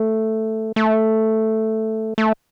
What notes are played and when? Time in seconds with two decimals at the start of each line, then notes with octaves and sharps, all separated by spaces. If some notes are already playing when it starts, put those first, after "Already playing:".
Already playing: A3
0.76 A3
2.18 A3